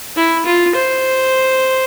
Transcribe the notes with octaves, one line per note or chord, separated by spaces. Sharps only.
E4
F4
C5